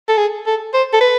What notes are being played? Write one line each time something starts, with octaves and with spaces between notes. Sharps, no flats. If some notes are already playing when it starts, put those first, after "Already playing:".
A4
G#4
A4
C5
A4
B4